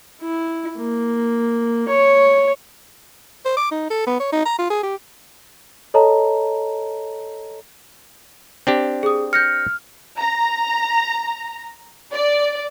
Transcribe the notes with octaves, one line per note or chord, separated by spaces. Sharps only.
E4
A#3
C#5
C5
D6
D#4
A4
B3
C#5
D#4
A#5
F4
G#4
G4
A4 C#5 D#5 A5 A#5
C4 D4 G4
G#4 D#6
F6 G6 A#6 C#7
A#5
D5